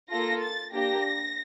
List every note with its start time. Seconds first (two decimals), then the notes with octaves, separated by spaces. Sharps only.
0.11 A#3 F4 A4 A#6
0.43 A6
0.73 A#3 D4 G4 A#6